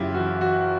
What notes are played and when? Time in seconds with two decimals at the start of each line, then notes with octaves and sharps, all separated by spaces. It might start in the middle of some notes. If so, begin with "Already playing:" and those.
Already playing: F#2 C#3 E4 F4 G4
0.14 E3 F#4
0.41 F#4